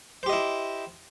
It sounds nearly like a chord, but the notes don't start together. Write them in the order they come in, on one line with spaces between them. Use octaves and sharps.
C5 G4 D#5 E4